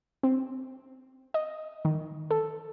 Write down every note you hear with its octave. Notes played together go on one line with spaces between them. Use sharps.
C4
D#5
D#3
A4